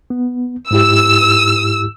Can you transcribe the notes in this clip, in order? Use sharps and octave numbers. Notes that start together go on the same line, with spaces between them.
B3
G#2 E4 G4 E6